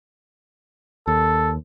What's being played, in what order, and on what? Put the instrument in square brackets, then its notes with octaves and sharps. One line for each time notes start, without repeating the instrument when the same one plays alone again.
[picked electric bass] D#2 [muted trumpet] A4